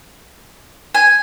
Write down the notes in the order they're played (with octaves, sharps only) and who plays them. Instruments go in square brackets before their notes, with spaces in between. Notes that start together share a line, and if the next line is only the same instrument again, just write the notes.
[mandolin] G#5